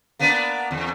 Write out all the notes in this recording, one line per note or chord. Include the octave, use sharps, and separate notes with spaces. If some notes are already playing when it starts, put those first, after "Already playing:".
A#3 B3 D4
E2